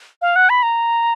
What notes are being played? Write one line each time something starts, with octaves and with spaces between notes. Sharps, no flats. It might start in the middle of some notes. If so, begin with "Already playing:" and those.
F5
F#5
B5
A#5